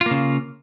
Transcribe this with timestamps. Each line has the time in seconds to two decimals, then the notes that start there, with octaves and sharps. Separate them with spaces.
0.01 F4
0.06 A#3
0.11 C#3